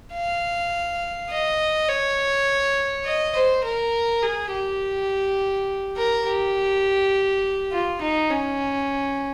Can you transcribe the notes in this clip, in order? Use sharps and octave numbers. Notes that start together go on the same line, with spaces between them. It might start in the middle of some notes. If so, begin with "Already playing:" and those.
F5
D#5
C#5
D#5
C5
A#4
G#4
G4
A#4
G4
F4
D#4
C#4